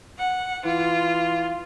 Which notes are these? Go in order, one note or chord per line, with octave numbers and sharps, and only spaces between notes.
F#5
E3 F4